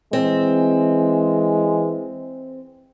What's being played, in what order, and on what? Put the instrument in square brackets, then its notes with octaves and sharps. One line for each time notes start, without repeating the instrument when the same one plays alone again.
[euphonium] E3 [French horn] G#3 [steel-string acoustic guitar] C4